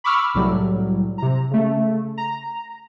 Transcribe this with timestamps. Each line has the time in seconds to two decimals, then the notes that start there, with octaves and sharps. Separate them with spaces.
0.04 B5 C#6 D6 E6 F6
0.34 C2 A2 F#3 G3
1.18 C3 A#5
1.51 C#3 A3
2.18 A#5